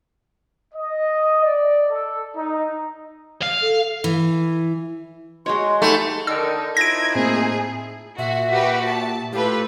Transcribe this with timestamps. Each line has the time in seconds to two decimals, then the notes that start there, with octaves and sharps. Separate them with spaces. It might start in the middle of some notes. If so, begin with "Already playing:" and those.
0.74 D#5
1.43 D5
1.91 A4
2.36 D#4
3.42 F5
3.61 A4
4.04 E3
5.46 G#3 F#4 C#5 D#5 C6
5.82 A3 D#4 G4 A4 F#5 B5
6.27 D3 D#3 E6
6.77 F3 D#4 E4 G#6 A#6 D7
7.15 A2 A#3 C4 G#4
8.18 A#2 F#4 E5
8.50 F#4 G4 B4
8.84 A5
9.33 A2 F4 G4 A4 B4